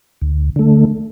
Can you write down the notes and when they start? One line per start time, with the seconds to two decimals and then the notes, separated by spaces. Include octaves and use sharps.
0.21 D2
0.56 D3 A3